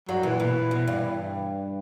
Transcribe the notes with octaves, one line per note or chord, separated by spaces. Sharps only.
G2 F#3
A#2 E3
B2
B2
G2